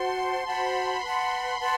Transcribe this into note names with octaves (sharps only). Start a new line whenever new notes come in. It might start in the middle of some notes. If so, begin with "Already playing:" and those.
Already playing: F#4 C5 F#5 A5 C6
F#4 C5 F#5 A5 B5
B4 F#5 A5 C6
B4 F#5 A5 C6